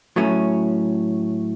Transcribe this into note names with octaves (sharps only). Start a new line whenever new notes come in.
A2 F#3 A3 C#4